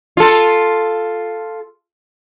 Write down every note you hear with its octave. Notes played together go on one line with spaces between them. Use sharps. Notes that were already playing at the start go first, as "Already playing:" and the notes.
F4 A4